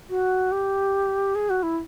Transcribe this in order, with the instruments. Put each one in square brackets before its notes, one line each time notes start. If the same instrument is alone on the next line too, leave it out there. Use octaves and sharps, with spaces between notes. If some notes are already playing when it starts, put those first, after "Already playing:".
[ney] F#4
G4
G#4
F#4
E4